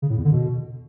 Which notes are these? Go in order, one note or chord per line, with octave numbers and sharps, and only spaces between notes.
C#3
A2
E2
D3
B2